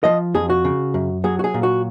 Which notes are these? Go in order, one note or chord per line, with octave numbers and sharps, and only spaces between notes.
F3 D#5
F2 G#4
F#4
C#3
F#2
F#3 G#4
F#4
G#4
A#2
F#4